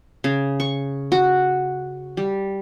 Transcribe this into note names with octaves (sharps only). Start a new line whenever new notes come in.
C#3
C#6
F#4
G3